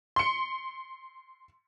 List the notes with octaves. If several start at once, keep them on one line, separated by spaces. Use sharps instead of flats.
C6 C#7